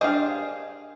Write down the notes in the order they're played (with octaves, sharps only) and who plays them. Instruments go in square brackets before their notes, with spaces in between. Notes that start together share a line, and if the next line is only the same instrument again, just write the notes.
[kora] D4 G4 [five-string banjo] G#4 F5 [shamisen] A#4 C5 D#5